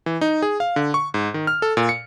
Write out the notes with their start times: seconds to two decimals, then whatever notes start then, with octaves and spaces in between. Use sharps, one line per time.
0.06 E3
0.21 D#4
0.42 G#4
0.60 F5
0.76 D3
0.94 C#6
1.14 G#2
1.34 D#3
1.47 F6
1.62 A4
1.77 A#2
1.89 C#7